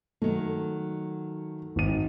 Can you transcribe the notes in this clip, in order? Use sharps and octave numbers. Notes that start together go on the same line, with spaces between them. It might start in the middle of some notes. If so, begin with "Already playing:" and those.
D#3 F#3 A3
G#1 D#7